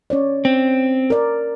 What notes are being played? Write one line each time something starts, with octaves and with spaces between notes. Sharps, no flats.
C#4 C#5 D5
C4
A#4 D5